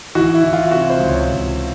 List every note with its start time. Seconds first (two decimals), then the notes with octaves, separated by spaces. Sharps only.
0.15 E3 F#4
0.34 E4
0.44 E3
0.53 F4
0.71 C3 F#4
0.90 C5
1.00 C#2
1.09 C#5
1.28 C#2